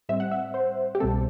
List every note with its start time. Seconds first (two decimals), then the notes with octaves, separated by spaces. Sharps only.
0.09 A2 G3 C4 E5
0.20 F#5
0.31 E5
0.54 C5
0.95 G4
1.00 C2 B2 G3 C4 A4